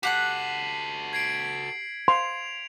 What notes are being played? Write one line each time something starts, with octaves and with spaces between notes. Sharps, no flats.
F#4 G4 A4 F#5 F#6 B6 C7 F#7
G#6 C7 D7
C6 F7